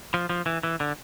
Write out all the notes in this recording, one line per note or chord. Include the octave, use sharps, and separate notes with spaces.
F3
F3
E3
E3
D3